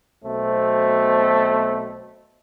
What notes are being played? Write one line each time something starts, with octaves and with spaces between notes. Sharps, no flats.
B1 B2 A3 C4